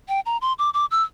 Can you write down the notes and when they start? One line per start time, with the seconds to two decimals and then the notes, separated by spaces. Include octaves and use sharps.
0.09 G5
0.26 A#5
0.42 C6
0.59 D6
0.74 D6
0.91 E6